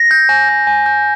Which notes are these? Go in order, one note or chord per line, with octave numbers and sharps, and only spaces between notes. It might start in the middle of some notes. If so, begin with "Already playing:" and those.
Already playing: A#6
G6
G#5
G6
G#5
G6